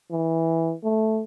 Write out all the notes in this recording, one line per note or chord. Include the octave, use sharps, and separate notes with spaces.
E3
A3